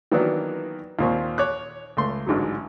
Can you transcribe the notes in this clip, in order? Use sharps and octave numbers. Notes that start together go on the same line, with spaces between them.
D#3 E3 F#3 A#3 B3 D4
D#2 A#2 C4 C#6
C#5 D6 F#6
C#2 A3 C6
A1 G#2 D3 F#3